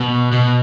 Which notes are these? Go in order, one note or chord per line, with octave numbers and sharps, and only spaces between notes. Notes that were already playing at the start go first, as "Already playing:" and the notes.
Already playing: B2
B2